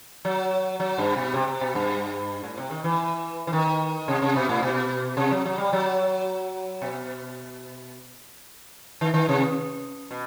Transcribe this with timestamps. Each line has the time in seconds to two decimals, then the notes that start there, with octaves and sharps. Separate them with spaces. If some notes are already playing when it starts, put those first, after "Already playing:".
0.25 F#3
0.80 F#3
0.98 G2
1.16 B2
1.34 C3
1.48 C3
1.61 B2
1.75 G2
2.43 A2
2.58 C3
2.71 D#3
2.84 E3
3.47 E3
3.53 D#3
4.08 C3
4.22 C3
4.36 B2
4.49 A2
4.63 B2
5.17 C3
5.31 F#3
5.45 F#3
5.58 G3
5.73 F#3
6.82 B2
9.01 D#3
9.14 D#3
9.29 C3
10.11 B2